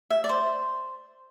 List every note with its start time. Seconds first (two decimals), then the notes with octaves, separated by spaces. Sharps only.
0.10 E5
0.24 D5
0.29 C5